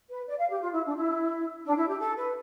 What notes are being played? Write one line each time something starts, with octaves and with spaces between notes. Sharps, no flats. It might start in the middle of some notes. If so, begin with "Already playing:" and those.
B4
D5
F5
G4
F4
E4
D4
E4
D4
E4
G4
A4
B4